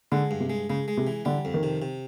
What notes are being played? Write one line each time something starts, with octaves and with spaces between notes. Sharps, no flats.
D3 G#3
G2
C3
G#3
C#3 G#3
G#3
C3
E3
D3 G3
F2
D#3
C3
C3